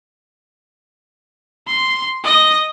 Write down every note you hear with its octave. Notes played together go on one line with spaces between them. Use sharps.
C6
D#5 A#6